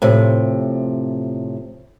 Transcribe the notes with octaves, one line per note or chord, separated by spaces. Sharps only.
A2 C3 F3